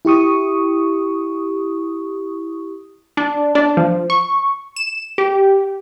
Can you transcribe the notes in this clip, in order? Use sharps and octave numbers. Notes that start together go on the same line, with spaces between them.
E4 G4 C#6 D#6
D4
D4
F3
C#6
E7
G4